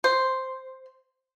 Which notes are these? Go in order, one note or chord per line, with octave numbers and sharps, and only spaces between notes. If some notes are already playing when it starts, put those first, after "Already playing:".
C5